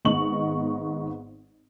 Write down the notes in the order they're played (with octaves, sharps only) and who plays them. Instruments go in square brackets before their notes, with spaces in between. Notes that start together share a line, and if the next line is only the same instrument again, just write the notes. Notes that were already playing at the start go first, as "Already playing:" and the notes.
[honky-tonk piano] G#1 G#2 B3 D#5 C#6 F#7